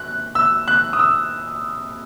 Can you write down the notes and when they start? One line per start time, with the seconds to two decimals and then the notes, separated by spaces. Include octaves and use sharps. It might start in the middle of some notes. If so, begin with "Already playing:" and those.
Already playing: F#6
0.35 E6
0.68 F#6
0.93 D#6
0.99 E6